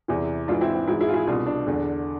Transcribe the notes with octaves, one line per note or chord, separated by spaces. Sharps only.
E2 C3 E3
G#2 E3 D4 F4
C4 E4
C4
G#2 E3 C4 E4
E4 G#4
F4
E4 G#4
C2 B2 D4 F4
D4
E2 D3